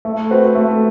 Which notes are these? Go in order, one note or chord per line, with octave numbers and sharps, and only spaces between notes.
A3
C4 F#4 B4
A3